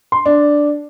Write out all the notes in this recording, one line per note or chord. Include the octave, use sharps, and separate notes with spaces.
C6
D4